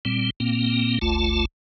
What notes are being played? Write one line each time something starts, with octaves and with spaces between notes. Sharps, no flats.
A#2 G3 C4
A#2 A#3 C4
G1 D2 A3 F4 A5